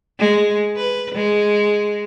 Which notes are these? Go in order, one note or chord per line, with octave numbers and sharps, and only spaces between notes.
G#3
B4
G#3